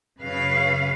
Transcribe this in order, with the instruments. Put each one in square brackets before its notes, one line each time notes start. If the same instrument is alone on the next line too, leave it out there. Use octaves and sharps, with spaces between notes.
[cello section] F#2 C#3 B4 F5